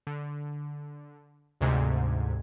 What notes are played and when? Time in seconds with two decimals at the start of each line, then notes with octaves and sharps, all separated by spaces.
0.07 D3
1.61 D2 G#2 C3 G#6